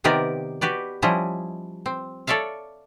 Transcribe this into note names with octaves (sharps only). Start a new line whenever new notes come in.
C3 D#3 B3 G4 A#4 D5
F#4 G4 B4 D5
F3 G3 C#4 E4 D#5
C4
A4 C#5 D5 E5 F5